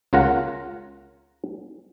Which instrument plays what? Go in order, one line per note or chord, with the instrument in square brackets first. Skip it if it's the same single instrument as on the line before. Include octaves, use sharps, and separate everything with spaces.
[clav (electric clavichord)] C#2 C#3 F4 A#4 F#5 A#5